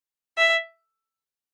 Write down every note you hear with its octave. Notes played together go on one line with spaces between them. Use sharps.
E5